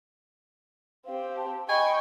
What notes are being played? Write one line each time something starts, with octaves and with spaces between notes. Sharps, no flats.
C4 G4 F5
A5
D#5 G5 G#5 B5 C#6